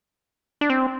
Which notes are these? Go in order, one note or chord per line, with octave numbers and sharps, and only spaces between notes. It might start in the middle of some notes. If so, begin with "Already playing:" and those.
D4
C4